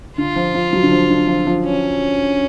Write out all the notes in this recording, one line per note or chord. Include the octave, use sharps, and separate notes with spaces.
D3 F4
F3
F3
F#3
D3
F3
D3
F3
F3
C#4